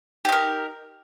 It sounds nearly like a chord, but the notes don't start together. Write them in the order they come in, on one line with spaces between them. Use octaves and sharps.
G4 D#4 A#4